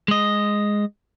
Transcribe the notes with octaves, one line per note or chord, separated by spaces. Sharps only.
G#3 D#5